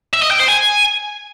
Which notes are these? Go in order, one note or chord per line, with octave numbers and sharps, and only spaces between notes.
E5
D#5
G5
C5
G#5